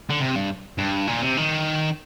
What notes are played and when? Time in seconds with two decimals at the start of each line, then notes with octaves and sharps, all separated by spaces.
0.10 D3
0.20 C3
0.35 G2
0.78 G2
1.07 A#2
1.22 C3
1.37 D#3